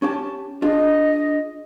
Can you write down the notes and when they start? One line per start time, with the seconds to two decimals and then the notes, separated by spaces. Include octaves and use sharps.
0.02 C#4 G4 A5
0.62 D4 F4 G#4 D#5